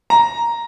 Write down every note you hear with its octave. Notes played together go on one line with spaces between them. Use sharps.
A#5